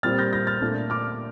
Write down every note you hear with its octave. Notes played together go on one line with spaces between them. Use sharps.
A#2 G3 C4 F6 A6
G6 A#6
G6 A#6
F6 A6
A#2 A3 D4
D6 F6